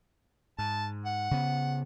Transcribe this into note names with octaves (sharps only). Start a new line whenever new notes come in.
G#2 A5
F#5
C#3 B3